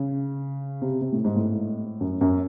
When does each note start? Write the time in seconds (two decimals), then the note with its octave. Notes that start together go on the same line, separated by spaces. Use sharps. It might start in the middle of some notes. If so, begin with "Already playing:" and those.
Already playing: C#3
0.82 C3
1.01 C3
1.12 A2
1.24 G#2
1.36 A2
2.01 F#2
2.21 F#2